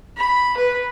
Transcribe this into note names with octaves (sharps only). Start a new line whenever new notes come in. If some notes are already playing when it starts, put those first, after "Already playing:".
B5
B4